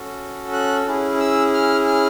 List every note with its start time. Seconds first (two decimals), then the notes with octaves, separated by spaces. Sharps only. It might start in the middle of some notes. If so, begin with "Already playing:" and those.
Already playing: C#4 F#4 A4
0.53 F#6
0.87 C#4 E4 G#4
1.20 E6
1.54 F6
1.87 F6